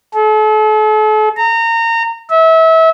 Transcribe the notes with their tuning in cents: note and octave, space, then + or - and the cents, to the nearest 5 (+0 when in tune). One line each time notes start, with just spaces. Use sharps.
A4 -40
A#5 -25
E5 -30